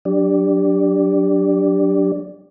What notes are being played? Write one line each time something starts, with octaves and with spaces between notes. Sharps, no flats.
F#3 D4 G4 D5